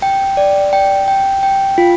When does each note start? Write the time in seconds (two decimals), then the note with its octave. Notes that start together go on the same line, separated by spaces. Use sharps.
0.02 G5
0.37 D5
0.73 G5
1.08 G5
1.43 G5
1.78 F4